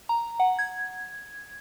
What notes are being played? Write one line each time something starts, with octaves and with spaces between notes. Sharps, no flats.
A#5
F#5
G#6